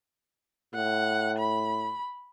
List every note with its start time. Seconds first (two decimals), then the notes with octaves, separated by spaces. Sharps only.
0.74 A2 F#5
1.38 B5